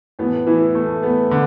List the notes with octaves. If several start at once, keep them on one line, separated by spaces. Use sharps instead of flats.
A2 E3 B3
E3 E4
A3
B3
D3